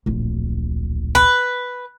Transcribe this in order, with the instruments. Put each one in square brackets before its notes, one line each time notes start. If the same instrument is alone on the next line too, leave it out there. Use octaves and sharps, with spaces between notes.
[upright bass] D1 A#1
[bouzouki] B4